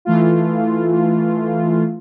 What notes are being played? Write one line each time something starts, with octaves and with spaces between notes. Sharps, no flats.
E3 A3 F4